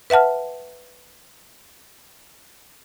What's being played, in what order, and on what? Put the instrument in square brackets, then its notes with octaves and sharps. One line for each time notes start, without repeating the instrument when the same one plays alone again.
[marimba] B4 E5 F#5 A5 F6